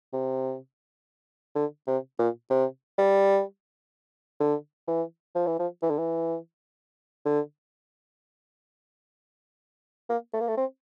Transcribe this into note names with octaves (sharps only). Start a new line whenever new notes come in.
C3
D3
C3
A#2
C3
G3
D3
E3
F3
E3
F3
E3
D3
E3
D3
A#3
A3
A#3
A3
C4